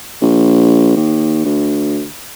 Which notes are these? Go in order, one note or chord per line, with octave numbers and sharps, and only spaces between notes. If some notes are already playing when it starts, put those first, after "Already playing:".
A#1
D#2
D2